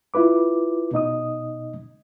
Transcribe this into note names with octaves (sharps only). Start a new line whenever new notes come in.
E4 F4 B4 D6
B2 D#4 D#5 D#6